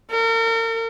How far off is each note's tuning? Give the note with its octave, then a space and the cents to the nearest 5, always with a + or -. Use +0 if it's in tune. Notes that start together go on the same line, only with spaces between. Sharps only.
A#4 -40